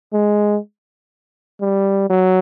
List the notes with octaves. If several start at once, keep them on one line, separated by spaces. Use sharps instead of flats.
G#3
G3
F#3